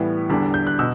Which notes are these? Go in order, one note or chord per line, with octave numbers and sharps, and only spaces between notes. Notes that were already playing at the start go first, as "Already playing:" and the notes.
Already playing: A2 E3 G3 B3
E2 D3 G3 D4
G6
F#6
B2 E6